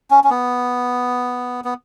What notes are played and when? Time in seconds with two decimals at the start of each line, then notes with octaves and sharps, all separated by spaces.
0.10 C#4
0.24 C#4
0.30 B3
1.64 B3